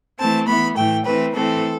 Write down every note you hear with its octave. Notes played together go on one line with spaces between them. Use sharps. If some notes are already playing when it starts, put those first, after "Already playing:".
E3 A3 C4 A5
E3 B3 B5
A2 E3 A3 G5
E3 A3 C4 B4
E3 A3 C4 A4